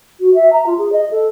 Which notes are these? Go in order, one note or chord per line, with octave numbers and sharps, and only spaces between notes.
F#4
E5
A#5
F4
G#4
D#5
A4